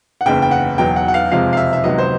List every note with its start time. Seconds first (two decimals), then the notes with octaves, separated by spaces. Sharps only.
0.21 F#5
0.26 F#1 E2 C#3 G5
0.42 G5
0.51 F#5
0.78 E1 E2 B2 F#3 G5
0.96 F#5
1.08 F#5
1.14 F5
1.31 F2 C3 F3 G#3 F5
1.53 F5
1.57 E5
1.73 E5
1.84 C#2 C3 D#3 F#3 B3 D#5
1.98 C5